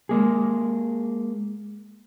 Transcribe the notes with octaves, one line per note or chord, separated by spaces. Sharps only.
G#3 A#3 G#4